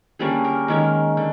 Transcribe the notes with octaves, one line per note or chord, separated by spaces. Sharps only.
D3 G3 A#3 C#4 G#4
A#4
D#3 G#3 C#4 A#4
D3